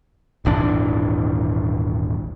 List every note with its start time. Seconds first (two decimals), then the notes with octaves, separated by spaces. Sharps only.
0.45 D#1 G#1 E3 D4